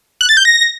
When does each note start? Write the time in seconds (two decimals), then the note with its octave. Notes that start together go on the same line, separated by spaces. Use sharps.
0.21 F#6
0.29 A6
0.37 G6
0.45 A#6